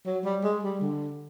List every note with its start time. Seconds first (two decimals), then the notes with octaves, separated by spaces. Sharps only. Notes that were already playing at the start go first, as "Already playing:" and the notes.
0.06 F#3
0.25 G3
0.44 G#3
0.63 G3
0.81 D3